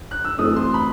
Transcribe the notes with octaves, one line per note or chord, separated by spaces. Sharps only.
F#6
E6
F#2 E3 A3 C4 D#6
C6
B5